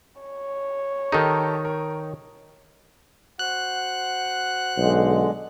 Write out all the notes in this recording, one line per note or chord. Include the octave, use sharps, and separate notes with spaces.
C#5
D#3 D#4 G4 A4 A#4
A#4
F#4 C5 F#5 F#6
B1 D3 G#3